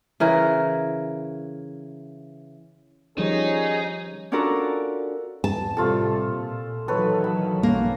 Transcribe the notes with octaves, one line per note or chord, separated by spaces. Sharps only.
C#3 E3 A#4
D#3 F3 G3 C#4 D#4 G#4
C#4 D4 F4 F#4 A4 A#4
E2 A5
A2 C3 G3 A3 F4 A4
A#2
D#3 E3 F#3 A4 B4 C#5
B5
B1 A#3 C#4